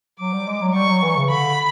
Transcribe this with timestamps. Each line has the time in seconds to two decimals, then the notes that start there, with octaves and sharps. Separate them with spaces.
0.20 F#3 D6
0.33 G3
0.48 G#3
0.62 F#3
0.75 G3 C#6
0.89 F#3
1.03 E3
1.17 C#3
1.31 D3 B5